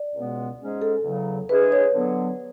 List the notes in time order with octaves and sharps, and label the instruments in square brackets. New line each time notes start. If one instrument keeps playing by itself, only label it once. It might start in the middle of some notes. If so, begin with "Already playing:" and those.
Already playing: [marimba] D5
[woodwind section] C#2 B2 G#3 B3
G#2 G#3 C#4 G#4
[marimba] A4
[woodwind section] E2 C#3 F#3
[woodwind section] E3 G#3 D4 G#4 [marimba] B4
[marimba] C#5
[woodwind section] D3 F#3 B3